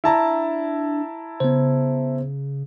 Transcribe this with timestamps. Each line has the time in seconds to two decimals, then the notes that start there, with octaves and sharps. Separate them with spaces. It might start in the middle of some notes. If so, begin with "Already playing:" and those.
0.04 D4 E4 A5 A#5
1.40 C#3 B3 C5